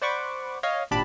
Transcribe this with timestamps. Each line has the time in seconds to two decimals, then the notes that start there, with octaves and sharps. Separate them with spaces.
0.02 C5 D5 F#5 B5 C#6 D6
0.63 C#5 D#5 F5
0.91 G#1 A#2 D4 G4 A5 B5